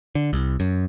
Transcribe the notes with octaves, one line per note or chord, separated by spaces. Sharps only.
D3
C2
F#2